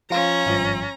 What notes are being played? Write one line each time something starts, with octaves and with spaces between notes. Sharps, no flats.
F3 C#4 F4 A#5
G#1 G2 F3